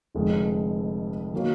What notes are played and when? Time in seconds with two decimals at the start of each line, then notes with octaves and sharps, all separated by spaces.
0.15 F1 F2 D3 G#3
1.34 D#3 F#3 A#3